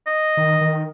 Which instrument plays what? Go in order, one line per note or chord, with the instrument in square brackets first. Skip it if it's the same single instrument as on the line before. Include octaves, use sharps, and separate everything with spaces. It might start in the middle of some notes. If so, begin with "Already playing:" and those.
[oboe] D#5
[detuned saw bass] D#3
D#3